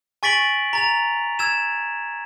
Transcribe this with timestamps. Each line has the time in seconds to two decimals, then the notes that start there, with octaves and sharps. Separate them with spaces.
0.23 G#5 C#6 A6 B6 D7 F#7
0.73 A#5 A6 F7
1.39 E6 G#6 E7